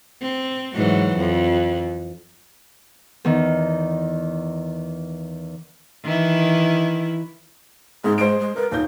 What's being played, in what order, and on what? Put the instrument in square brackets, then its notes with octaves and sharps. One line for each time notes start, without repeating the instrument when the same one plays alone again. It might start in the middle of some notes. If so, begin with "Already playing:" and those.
[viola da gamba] C4
G#2 E3 F#3
F2
[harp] E2 D#3
[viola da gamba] D#3 E3 E4
[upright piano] G#2 [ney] G#4
[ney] G#3 [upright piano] C5 D7
[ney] G#3
[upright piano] A#4 [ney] B4
[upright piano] D#1 G6 [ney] D#4